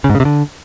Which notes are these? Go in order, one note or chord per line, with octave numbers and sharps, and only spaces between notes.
C#3
G#2
C#3
C3
D3